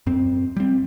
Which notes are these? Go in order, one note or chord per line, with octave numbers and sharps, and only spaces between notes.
F#2 C4
G3 C4